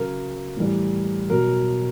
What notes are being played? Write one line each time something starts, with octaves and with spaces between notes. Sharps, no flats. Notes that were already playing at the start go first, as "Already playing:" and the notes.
Already playing: C#3 F#3 A#4
A2 E3 G3
B2 F#3 A#4